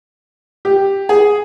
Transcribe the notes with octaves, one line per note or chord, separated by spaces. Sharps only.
G4
G#4